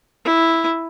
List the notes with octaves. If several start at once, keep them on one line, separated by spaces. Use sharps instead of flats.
E4